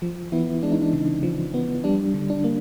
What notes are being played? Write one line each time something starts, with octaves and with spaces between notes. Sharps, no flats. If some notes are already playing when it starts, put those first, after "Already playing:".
F3
E3 B3 E4
G#3 D4
D#4
D4
C#3
F3
B3
G3 D4
D3
D4
A#3